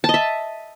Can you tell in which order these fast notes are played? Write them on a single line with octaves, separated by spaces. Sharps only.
A5 D#5 E5